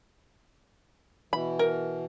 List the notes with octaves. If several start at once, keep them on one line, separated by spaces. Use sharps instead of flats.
B2 E3 B5
A#4